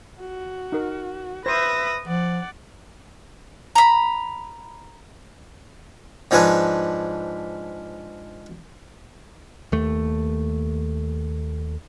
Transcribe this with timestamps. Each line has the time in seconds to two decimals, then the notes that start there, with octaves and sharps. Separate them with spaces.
0.20 F#4
0.72 D#4 A#4
1.46 B4 C5 E5 D#6 A#6
2.08 F3 D5 F#5
3.76 A#5 B5
6.31 G#2 F3 D4 B4 G#5 A5
9.72 D#2 A3